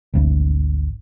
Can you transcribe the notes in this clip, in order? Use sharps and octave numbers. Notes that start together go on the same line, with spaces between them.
G#1 D2